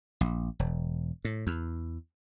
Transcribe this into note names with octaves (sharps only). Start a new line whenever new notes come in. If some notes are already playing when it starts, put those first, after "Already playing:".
A#1
E1
A2
E2